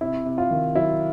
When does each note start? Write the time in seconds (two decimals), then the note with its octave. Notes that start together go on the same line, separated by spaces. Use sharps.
0.01 C3 E4
0.26 C3
0.38 F4
0.51 D#3
0.75 F#3 E4